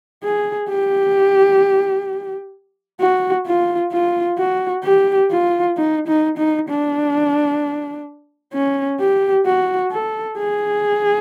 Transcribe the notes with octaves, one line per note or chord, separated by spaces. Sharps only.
G#4
G4
F#4
F4
F4
F#4
G4
F4
D#4
D#4
D#4
D4
C#4
G4
F#4
A4
G#4